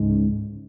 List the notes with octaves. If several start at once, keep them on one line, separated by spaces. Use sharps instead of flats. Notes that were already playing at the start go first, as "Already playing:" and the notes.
Already playing: C#2 G#2 G#3
C#3